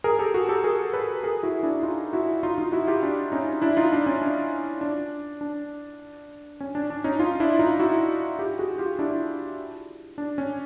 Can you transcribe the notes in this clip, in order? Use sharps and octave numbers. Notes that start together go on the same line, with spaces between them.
G#4 A#4
G4 A4
F#4 G#4
G4 A4
G#4 A#4
A4 B4
G#4 A#4
E4 F#4
D4 E4
D#4 F4
E4 F#4
D#4 F4
D#4 F4
E4 F#4
F4 G4
D4
C#4 D#4
D4 E4
D#4 F4
D4
C#4
D4
D4
D4
C#4
D4
D4
C#4 D#4
D#4 F4
D4 E4
D#4 F4
E4 F#4
F4 G4
F#4 G#4
F4 G4
D4 E4
D4
C#4